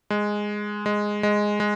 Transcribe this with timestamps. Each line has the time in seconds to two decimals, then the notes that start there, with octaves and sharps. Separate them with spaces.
0.10 G#3
0.86 G#3
1.23 G#3
1.60 G#3